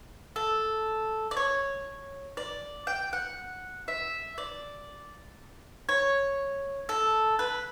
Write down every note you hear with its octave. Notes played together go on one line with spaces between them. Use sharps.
A4
D5
C#5
D5
G5
F#5
E5
D5
C#5
A4
B4